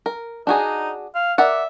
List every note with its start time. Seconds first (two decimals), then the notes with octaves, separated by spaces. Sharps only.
0.06 A#4
0.47 D4 D#4 F#4 G#4
1.15 F5
1.38 A#4 D5 E5 F#5